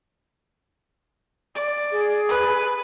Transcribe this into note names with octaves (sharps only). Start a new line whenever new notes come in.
D5
G#4
B4